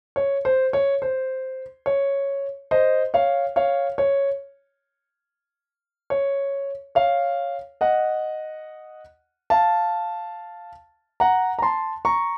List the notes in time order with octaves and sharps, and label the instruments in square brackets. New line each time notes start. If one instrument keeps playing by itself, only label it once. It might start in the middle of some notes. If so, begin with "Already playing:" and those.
[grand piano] C#5
C5
C#5
C5
C#5
C5 D#5
C#5 F5
C#5 F5
C#5
C#5
C#5 F5
D#5 F#5
F5 A5
F#5 A#5
A#5
A5 C6
A#5 C#6